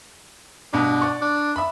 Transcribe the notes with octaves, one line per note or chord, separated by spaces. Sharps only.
G2 B2 D4
D5 C#6
D4
E5 B5